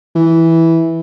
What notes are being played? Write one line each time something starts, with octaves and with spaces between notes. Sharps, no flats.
E3